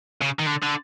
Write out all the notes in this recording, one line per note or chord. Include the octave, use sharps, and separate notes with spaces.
C#3
D#3
D3
D3